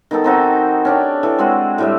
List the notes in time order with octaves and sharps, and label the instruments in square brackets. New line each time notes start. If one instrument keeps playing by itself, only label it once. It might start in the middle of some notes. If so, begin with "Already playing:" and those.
[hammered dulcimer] D#3 B3 D#4 A4
C4 D#4 F#4
C#4 D4 G4
E3 A4
G#3 C4 F#4
A2 G3 E5